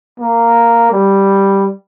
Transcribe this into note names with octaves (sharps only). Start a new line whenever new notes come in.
A#3
G3